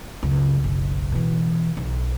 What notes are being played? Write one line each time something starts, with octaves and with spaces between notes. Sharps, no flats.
C#2 F#2
F#1 B1
B2 E3
B1